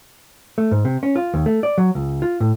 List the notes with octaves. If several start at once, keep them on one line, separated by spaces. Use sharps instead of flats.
A3
G#2
C3
C#4
F4
D#2
A3
D5
F#3
C#2
F4
A2